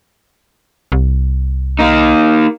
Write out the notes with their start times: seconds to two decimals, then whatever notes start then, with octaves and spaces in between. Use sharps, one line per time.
0.92 C2
1.79 A#3 D#4